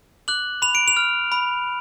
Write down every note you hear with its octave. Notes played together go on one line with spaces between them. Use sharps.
D6 F#6 F#7
B5 F7
D7
F7
F6
B5